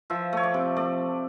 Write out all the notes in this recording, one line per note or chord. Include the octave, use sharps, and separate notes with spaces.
F3 E5
A3 C#5
D5
C3
A3 D5